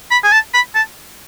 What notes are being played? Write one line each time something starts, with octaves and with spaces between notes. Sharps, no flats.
B5
G#5
A5
B5
A5